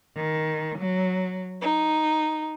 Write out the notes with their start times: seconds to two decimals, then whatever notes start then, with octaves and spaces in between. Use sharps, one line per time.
0.16 D#3
0.78 F#3
1.61 D#4